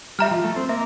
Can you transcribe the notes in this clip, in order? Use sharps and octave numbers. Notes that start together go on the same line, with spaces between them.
G3 E5 A#5 F6
F3
A3
C4
A#3 E5